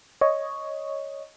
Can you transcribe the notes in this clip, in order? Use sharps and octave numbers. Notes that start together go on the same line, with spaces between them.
C#5 D#5